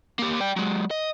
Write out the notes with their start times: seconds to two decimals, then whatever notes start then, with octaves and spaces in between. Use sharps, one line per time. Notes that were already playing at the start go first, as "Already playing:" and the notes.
0.19 A#3 G4
0.40 D5 G5
0.56 F#3 G#3
0.91 D#5